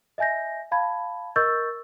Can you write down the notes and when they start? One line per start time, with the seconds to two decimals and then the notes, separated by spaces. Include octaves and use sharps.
0.18 D#5 E5 G#5 G6 A#6
0.72 F5 A5 B5 G#6
1.36 A#4 D#5 C#6 E6 G6 A6